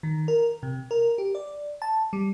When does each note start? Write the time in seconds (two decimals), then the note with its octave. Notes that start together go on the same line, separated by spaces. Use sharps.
0.03 D#3
0.28 A#4
0.63 C3
0.91 A#4
1.18 G4
1.35 D5
1.82 A5
2.13 G3